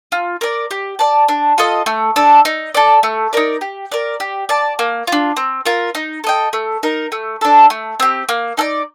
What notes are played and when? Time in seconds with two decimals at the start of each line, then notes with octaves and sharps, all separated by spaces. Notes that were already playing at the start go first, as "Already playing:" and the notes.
0.12 F4
0.41 A#4 D5
0.71 G4
0.99 D5 A5
1.29 D4
1.58 F4 A4 D#5
1.86 A3
2.16 D4 A4
2.45 D#4
2.75 A4 D5
3.03 A3
3.33 D#4 A#4 D5
3.61 G4
3.92 A#4 D5
4.20 G4
4.49 D5 A5
4.79 A#3
5.07 D4 F4
5.37 C4
5.66 F4 A#4
5.95 D#4
6.24 A4 D#5 G5
6.53 A3
6.83 D#4 A#4
7.12 A3
7.41 D4 A4
7.70 A3
8.00 C4 G4
8.29 A#3
8.57 D#4 A4 D5